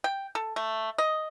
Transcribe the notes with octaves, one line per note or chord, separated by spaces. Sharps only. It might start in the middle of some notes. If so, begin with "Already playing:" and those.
G5
A4
A3
D#5